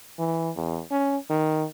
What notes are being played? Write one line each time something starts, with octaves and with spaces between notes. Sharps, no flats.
E3
E2
C#4
D#3